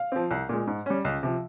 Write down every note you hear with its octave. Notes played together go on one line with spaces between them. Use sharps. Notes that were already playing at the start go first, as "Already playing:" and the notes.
Already playing: F5
F3 C4
C2
A#2 G#3
G#2
G3 C#4
C#2
C3 F3